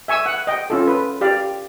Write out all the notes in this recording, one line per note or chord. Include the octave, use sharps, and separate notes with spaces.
E5 G#5 C#6 E6
F#5
D#5 G5
C#4 F4 A4
B4
G4 D5 F5